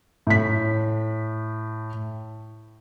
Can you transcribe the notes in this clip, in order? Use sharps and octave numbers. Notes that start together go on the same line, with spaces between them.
A2 B6